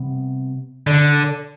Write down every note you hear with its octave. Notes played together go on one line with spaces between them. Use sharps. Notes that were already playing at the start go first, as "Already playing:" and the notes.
Already playing: C3 G3 B3
D3